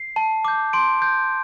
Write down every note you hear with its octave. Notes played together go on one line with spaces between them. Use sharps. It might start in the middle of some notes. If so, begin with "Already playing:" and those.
Already playing: C7
A5
D6 G6
C6 D7
G6